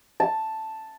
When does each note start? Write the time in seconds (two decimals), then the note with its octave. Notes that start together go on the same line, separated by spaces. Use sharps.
0.20 A5